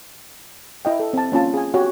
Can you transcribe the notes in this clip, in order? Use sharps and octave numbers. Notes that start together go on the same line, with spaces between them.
E4 D#5 G5
A4
C4 A5
A#3 C#4 F4 A5
G#4 G#5
F#4 G4 C#5